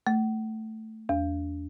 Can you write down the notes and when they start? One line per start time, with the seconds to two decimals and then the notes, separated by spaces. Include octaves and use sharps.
0.07 A3
1.09 E2